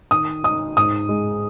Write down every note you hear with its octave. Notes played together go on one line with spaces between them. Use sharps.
D#3 D#6
D#4 D#6
G#2 D#6
G#3